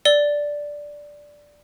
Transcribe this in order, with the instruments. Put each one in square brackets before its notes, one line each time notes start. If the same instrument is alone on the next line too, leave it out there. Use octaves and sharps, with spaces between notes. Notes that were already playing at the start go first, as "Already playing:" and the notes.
[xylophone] D5 G7